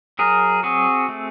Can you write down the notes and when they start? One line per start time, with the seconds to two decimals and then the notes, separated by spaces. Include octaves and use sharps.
0.19 F#3 G#4 A#4
0.63 C4 F#4 G#4
1.09 A3